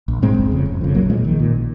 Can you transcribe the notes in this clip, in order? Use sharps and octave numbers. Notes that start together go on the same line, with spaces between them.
A#1
G#2 G#3 C4
F1
F2 C#3
F1
F2 C#3
A#1 F#3 A#3
A#2 F3 G#3
A#1 D#3
A#2